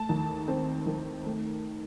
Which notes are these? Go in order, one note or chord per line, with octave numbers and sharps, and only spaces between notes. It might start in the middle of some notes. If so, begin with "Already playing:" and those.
Already playing: A3 A5
D#2
C4
D#3
A3